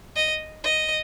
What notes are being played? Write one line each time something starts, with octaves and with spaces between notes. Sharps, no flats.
D#5
D#5